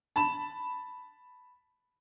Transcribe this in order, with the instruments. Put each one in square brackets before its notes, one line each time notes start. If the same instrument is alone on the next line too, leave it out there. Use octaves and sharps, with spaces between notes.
[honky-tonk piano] A5 B5 E7